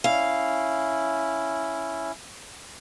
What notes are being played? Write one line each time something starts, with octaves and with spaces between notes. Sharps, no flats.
C#4 E4 F5